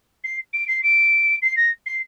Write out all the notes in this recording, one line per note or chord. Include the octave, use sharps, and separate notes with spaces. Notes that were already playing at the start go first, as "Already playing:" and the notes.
C7
D7
C7
D7
C7
A#6
C7